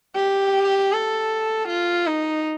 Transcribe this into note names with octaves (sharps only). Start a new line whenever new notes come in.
G4
A4
F4
D#4